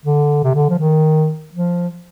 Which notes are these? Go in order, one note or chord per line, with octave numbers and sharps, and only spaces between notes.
D3
C3
D3
F3
D#3
F3